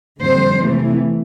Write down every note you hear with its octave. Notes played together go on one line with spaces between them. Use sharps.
F2 D3 G3 C5
C3 E3 A3